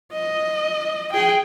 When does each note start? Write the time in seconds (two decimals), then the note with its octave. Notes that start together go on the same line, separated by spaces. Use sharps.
0.12 D#5
1.13 G#4 G5